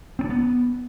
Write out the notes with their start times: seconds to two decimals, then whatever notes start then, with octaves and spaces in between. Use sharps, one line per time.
0.19 C4
0.24 D4
0.30 B3